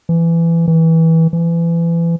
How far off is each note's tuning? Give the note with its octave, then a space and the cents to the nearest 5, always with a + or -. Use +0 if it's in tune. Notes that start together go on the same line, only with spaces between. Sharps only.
E3 +20
E3 -20
E3 +30